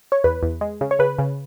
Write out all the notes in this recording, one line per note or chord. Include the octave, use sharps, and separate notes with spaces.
C#5
E2 B4
E2
G#3
C#3
C#5
C#3 B4
C#3